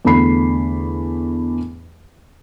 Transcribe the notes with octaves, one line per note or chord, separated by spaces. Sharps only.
E2 D3 A3 B5 C7